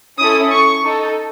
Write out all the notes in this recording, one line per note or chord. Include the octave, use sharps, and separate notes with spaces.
C#4 E4 A4 D#6
C#6
D#4 A4